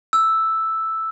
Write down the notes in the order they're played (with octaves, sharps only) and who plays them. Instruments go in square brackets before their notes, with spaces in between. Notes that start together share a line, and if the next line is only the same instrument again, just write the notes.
[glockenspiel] E6